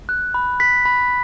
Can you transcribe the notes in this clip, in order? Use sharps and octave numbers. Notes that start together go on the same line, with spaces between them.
F#6
B5
F#6 B6
B5